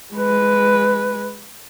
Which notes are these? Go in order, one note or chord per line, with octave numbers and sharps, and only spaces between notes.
G#3 B4